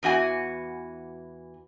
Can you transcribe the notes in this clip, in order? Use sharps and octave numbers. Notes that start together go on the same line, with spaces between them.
E2 E3 F#4 G#5